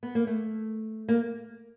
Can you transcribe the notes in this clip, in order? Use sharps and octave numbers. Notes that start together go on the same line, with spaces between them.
B3
A#3
A3
A#3